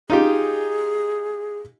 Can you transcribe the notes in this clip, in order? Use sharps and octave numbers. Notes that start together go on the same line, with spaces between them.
D#4 F4 G4 G#4